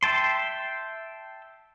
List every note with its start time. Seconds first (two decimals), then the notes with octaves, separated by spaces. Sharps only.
0.03 E5 G5 A5 C6